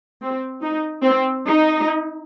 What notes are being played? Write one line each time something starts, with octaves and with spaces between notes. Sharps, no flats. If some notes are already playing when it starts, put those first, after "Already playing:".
C4
D#4
C4
D#4